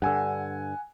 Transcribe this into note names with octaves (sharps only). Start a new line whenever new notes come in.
G2 D3 F#5 G#5 E6